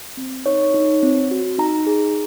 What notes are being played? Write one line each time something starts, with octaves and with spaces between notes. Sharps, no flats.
C4
D#4 C#5
D#4
C4
F#4
D#4 A#5
G#4